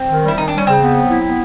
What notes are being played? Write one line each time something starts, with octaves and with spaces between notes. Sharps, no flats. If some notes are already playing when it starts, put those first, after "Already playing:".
Already playing: C4
D#3
G3
E4
D#3 D#4
D4
G3 C#4
C#3 C4
B3
F#3
E4
B3